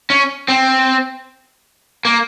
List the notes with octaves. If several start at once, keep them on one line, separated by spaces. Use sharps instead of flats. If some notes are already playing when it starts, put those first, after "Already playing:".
C#4
C4
A#3